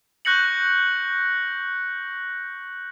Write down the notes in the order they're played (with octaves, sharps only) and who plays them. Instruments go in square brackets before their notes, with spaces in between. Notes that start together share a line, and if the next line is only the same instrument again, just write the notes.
[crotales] C#6 F#6 G6 A#6 C#7 F#7